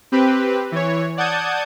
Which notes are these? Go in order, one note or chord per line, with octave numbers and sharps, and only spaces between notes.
C4 G4 B4
E3 C#5
D5 F#5 A5 D#6 G6 G#6